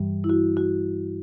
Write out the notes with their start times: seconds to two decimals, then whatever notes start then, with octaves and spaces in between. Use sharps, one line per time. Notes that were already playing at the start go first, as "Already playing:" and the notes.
Already playing: G2 E3 G3
0.24 E4
0.30 F#4
0.57 F#4